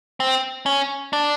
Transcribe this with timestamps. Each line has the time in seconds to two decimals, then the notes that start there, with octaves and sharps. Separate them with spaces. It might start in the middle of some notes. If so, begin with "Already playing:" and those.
0.20 C4
0.66 C#4
1.13 D4